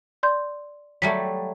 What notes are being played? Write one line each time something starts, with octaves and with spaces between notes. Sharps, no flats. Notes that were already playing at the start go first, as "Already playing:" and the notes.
D5 C6 G6
F#3 G3 A3 B6